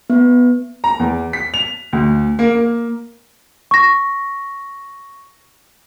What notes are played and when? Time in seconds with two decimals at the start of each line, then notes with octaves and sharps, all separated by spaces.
0.10 B3
0.84 A#5
0.99 E2
1.33 B6
1.54 F7
1.93 D2
2.39 A#3
2.55 A#3
3.71 C#6 A#6